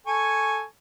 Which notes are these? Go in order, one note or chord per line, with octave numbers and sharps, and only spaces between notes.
A4 G#5 C#6